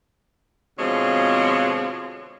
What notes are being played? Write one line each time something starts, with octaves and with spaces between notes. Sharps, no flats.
B2 D3 F3 G#3 C4 C#5